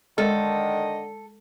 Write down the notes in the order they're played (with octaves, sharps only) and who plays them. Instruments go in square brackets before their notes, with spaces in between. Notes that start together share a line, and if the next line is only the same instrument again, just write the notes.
[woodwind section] D3 D#3 [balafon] G#3 A#4 [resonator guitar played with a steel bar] A4 [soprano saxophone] D#5